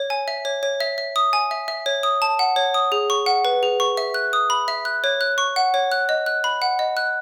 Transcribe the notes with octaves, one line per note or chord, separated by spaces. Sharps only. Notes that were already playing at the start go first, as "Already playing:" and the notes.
Already playing: C#5
G#5
E5
C#5
C#5
E5
E5
D#6
G#5
E5
E5
C#5
D#6
A5
F#5
C#5
D#6
G#4
C#6
F#5
B4
G#4
C#6
E5
F#6
D#6
B5
E5
F#6
C#5
F#6
C#6
F#5
C#5
F#6
D#5
F#6
B5
F#5
D#5
F#6